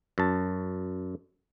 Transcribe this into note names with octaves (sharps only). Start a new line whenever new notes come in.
F#2 A5